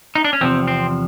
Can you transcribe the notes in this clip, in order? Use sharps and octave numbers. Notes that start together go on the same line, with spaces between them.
D#4
D4
C#4
E2 C3 F3 C4
C4